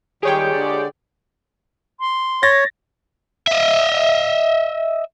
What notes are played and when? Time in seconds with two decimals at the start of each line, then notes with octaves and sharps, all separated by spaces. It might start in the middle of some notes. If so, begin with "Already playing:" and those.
0.23 A#2 D#3 G3 G#3 G4 G#4 C#5 G5
0.52 D3 D5
2.00 C6
2.43 C#5 A6 A#6
3.47 D#5 E5